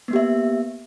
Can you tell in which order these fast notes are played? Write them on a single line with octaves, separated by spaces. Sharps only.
B3 A#3 G4 E5